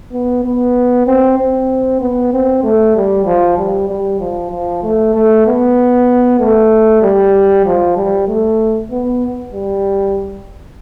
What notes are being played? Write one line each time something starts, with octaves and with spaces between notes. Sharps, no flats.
B3
B3
C4
C4
B3
C4
A3
G3
F3
G3
G3
F3
F3
A3
A3
B3
A3
G3
F3
G3
A3
B3
G3